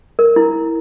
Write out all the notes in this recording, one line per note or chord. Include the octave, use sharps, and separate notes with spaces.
A#4
E4